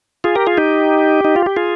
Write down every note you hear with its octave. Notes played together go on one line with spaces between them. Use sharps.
F4 G#4
G4 A#4
F4 G#4
D#4 G4
D#4
F4
G4
F4 G#4